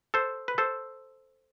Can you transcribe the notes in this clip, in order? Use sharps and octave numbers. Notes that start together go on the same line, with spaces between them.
A4 C5
B4
A4 C5